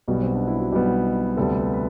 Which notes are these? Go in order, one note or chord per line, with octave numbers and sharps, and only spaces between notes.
B1 B2 G3 B3 F#4
C4
D4
E4
F#4
B1 B2 G3 B3 G4
D2 C3 G3 B3 A4
B4
B4